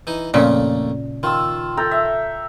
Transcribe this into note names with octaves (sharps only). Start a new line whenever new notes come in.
E3 D#4
F2 A#2 C#3 A3 A#3
D#3 F4 E6
A4 G5 A#5
E5